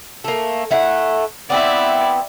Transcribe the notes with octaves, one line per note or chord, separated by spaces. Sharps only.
A3 A#3
A3 E4 F#5
B3 C4 E4 D5 E5